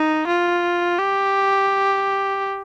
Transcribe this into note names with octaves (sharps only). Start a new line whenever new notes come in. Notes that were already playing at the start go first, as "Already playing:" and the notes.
Already playing: D#4
F4
G4